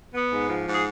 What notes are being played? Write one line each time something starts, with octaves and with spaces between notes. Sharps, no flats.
B3
G#2
F3
G#2
G#4